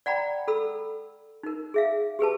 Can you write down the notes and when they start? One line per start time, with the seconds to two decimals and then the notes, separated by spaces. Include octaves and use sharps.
0.06 D5 F#5 G5 A#5 B5
0.48 A4 B5 E6
1.43 D#4 A#4
1.74 G#4 E5 F5
2.19 G4 G#4 B4 A5